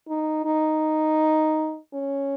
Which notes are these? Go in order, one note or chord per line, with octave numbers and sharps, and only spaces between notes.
D#4
D#4
C#4